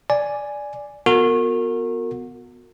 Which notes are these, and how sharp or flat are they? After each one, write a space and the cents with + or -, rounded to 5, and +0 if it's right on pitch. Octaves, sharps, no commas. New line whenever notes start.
D5 +0 G#5 +0
B3 +0 F#4 -35 A#4 -35